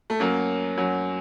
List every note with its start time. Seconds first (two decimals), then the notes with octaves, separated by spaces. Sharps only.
0.10 A3
0.20 F#2 F#3 A#3
0.77 F#2 F#3